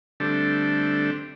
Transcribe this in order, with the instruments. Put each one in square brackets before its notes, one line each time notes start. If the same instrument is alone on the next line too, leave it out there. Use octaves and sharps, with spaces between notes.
[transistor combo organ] D3 G3 A3 C4 D4